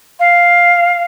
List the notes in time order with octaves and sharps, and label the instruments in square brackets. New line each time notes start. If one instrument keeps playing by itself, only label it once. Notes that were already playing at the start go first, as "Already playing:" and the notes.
[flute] F5